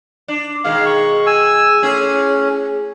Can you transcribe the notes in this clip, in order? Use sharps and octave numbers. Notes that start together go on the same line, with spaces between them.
D4
B2 D#3 G#3 F5
C#6
G#5 E6
A2 C#4 G#4